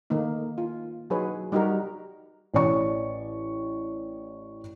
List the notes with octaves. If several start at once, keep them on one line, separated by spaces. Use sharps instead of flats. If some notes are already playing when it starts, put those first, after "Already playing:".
D#3 A3 A#3 D#4
F4
F#3 D#4 G#4 B4 C#5
G3 D#4 F#4 G4 A#4
A1 C#5 D5 C#6